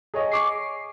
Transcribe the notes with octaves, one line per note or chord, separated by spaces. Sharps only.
G#4 C#5 D#5
C#6 D6 C7